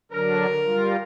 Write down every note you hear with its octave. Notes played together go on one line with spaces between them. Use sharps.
D3 F#3 D4 A#4
G3 F4